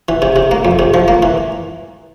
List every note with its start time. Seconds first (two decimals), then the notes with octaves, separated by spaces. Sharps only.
0.09 E3
0.22 C3
0.36 C3
0.51 A#3
0.65 F2
0.79 C3
0.94 F3
1.08 A#3
1.23 E3